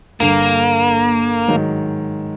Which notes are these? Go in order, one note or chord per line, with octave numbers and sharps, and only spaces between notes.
G1 G2 D3 A#3
G#2 D#3 F#3